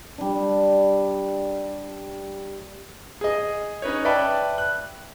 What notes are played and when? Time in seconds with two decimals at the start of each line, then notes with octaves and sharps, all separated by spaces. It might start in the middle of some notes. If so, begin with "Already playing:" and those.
0.18 G3 D4
3.21 G#4 D#5
3.82 C#4 D#4 B4 C#5
4.05 B4 D5 E5 G5 A5 B5
4.58 F#6